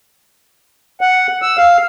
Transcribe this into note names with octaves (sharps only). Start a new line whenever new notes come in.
F#5
E6
F5